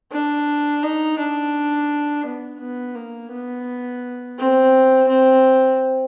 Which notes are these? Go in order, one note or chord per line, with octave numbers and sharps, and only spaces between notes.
D4
D#4
D4
B3
B3
A#3
B3
C4
C4